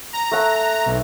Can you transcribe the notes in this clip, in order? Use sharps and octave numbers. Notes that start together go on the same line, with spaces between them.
A#5
A3 F#5
B1